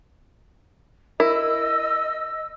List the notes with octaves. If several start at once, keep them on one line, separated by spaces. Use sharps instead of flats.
E4 A#4 D#5 E6